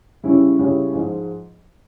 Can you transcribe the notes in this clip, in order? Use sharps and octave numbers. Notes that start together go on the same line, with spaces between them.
C#3 G3 C#4 E4
C#3 G3 C#4 E4
G#2 F3 G#3